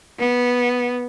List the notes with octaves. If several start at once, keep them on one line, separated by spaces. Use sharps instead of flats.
B3